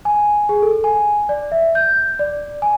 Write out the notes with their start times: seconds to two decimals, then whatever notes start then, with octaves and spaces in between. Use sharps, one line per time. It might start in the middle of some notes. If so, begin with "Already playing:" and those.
0.05 G#5
0.49 G#4
0.62 A4
0.84 G#5
1.29 D5
1.52 E5
1.75 G6
2.19 D5
2.62 G#5